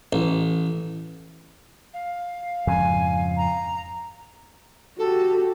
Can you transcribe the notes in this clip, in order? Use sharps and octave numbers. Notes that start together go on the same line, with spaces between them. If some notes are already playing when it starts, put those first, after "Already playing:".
A1
F5
F2 G#2 C#3 G#5
A#5
F#4 G4 A4